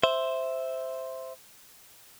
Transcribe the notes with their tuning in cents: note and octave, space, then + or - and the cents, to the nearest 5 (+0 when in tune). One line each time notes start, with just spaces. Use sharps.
C5 +0 E5 +0